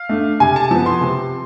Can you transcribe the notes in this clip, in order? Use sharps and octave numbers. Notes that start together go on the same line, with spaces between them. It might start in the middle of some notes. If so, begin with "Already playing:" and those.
Already playing: F5
A3 D4
C3 G#5
A5
F3 B3 A5
C6
C3